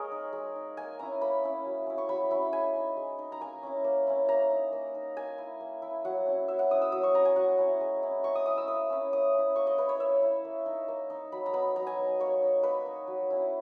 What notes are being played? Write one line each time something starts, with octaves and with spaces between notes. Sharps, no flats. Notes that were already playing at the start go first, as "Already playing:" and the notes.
Already playing: G#3 A#3 G#4 A#4 C#5 D#5
D#4
G#3
D#4
A#3 G#5
C#4 E4 A#5
A#3 B5
C#4 E4
F#3
C#4 E4
C#6
F#3 B5
C#4 E4 B5
G#3 G#5
D#4
G#3
D#4
A#5
A#3 G#5
C#4 E4
A#3
C#4 E4
A#3 A#5
D#4
A#3
D#4
A#3 G#5
E4
A#3
E4
F#3 F#5
C#4 E4
F#3 E5
F#5
C#4 E4 D#6
E6
F#3 D#6
C#6
C#4 E4 A#5
G#5
F#3 F#5
C#4 E4
G#3
C#4 E4
G#3 C#6
D#6
C#4 E4 D#6
E6
A#3 D#6
C#4 E4
A#3 D#6
C#4 E4
A#3 C#6
D#5
E4 B4
C#5
A#3 E5
E4
A#3
D#4
A#3
D#4
F#3 B5
A#5
B3 D#4 B5
F#3 A#5
G#5
B3 D#4
A#3 C#5
D#4
A#3 B4
D#4
F#3
C#4 E4